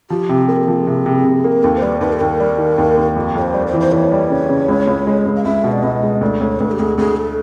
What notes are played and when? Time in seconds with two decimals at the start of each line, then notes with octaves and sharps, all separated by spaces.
0.10 F3 G4
0.29 C3
0.48 A#3 G#4
0.56 A4
0.63 F3 G#4
0.87 C3
1.06 C3
1.25 C3
1.44 A#3
1.52 A#4
1.63 D#2 A4
1.77 C5
1.82 G3 B4
2.01 D#2 B4
2.13 A4
2.20 D#2 A#4
2.40 G3
2.58 D#3
2.78 D#2
2.97 D#2
3.17 F2
3.35 F2 C#5
3.42 C5
3.54 G3
3.67 C5
3.73 E3
3.81 C5
3.92 E3 C#5
4.11 G3
4.30 C#3
4.49 C#3
4.69 C#2
4.88 C#2
5.07 G#3
5.26 C#2
5.36 F5
5.45 C#2 E5
5.64 B2
5.72 D5
5.83 C#2 D#5
6.03 G#3
6.21 D2 D5
6.40 D2 C#5
6.59 D2 B4
6.71 G4
6.79 D2 G#4
6.98 D2 G#4
7.16 A4